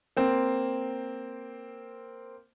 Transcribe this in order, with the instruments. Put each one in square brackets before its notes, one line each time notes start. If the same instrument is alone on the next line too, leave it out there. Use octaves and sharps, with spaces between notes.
[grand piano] A#3 C4